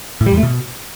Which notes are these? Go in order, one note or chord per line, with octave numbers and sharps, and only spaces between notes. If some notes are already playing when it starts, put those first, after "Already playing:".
A2
G3
E2
A3
B2